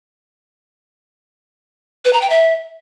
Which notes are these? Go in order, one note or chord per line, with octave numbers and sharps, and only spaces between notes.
B4
A#5
G5
E5